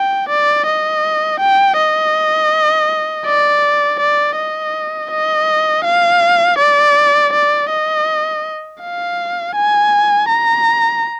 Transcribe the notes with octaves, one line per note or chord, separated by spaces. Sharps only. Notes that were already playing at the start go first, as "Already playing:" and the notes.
Already playing: G5
D5
D#5
G5
D#5
D5
D5
D#5
D#5
F5
D5
D5
D#5
F5
G#5
A#5